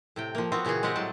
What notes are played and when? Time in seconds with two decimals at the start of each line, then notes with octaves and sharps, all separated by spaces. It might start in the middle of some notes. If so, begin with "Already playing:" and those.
0.16 A2 C3 G5
0.35 F3 A#3
0.52 B3 C4 F4 F#4
0.65 A#2 C#3 E3 F#4 G#4
0.83 G#3 C4 G4 D#5 F#5
0.95 A2 F#3 G3 A5